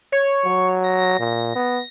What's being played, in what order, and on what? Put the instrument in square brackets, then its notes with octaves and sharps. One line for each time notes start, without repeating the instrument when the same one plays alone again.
[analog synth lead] C#5
[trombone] F#3
[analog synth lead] A#6
[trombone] A#2
B3